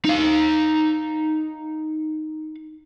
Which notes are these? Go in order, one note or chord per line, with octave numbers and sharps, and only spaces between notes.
D#4 F5